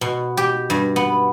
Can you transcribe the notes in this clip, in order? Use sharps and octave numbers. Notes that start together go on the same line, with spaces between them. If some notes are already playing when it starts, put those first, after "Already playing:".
B2
G4
G2
B3